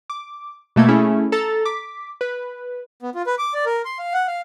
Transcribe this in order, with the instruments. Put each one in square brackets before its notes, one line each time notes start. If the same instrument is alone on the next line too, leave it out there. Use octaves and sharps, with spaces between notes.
[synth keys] D6
B2 A3 A#3 G#6
A3 C#4 E4 G#4
A4 A#5 A6
D6 B6
B4
[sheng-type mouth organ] B3
F4
B4
D6
D5
A#4
C6
F5
F#5
F5